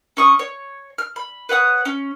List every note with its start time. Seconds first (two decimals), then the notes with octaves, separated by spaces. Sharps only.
0.17 C#4 C#6 D#6
0.39 C#5
0.98 F6
1.16 B5
1.49 B4 C#5 F#5 D#6
1.85 C#4